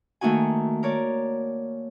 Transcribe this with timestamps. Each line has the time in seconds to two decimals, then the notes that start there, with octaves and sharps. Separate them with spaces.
0.21 D#3 A3 A#3 D#4 F#4 G#5
0.83 A#4 C#5 D5